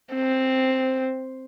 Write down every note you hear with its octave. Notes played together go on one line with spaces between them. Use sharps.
C4